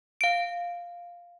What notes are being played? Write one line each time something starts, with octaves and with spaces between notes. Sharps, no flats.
F5 D7